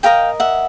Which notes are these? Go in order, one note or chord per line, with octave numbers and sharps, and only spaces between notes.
G4 A#4 D#5 F5 G5
E5 F#5